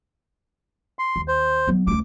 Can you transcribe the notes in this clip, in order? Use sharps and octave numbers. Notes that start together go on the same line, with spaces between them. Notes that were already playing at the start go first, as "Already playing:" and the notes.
C6
D#2
C5
F#3 B3
C#2 A3 D6